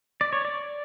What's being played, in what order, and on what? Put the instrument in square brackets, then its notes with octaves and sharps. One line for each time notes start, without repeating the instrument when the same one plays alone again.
[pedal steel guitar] D5
C#5
D5